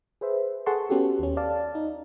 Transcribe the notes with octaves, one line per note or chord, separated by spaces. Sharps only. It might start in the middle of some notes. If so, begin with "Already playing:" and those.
G#4 B4 C5 E5
G#4 A4 F#5 A5 C6 C#6
B3 C#4 F#4 G4 A4
D#2 C#4
D5 F5 A5
D#4